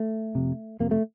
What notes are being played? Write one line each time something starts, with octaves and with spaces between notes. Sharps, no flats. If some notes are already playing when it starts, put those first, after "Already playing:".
Already playing: A3
F2 C3
F2 C3 A#3
A3